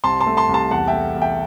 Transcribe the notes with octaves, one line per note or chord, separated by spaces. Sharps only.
C2 A5 C6
A5 C6
A3
A5 C6
C2
A5 C6
E2 F#5 A5
E5 G5
A3
E2
E5 G5